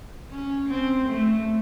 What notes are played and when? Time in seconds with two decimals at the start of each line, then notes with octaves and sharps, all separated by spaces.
0.31 C#4
0.69 C4
1.09 A3